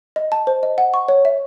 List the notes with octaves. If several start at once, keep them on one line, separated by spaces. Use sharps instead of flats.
D#5
A5
C5
D#5
F#5
C#6
C#5
E5